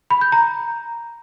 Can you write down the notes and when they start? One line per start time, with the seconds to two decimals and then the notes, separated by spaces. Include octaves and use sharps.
0.10 B5
0.21 G6
0.32 A#5